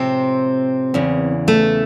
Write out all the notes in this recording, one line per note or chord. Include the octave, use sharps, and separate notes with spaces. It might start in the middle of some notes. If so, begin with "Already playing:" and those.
Already playing: A2 C3 F3 G#3 C4
E2 C#3 E3
A3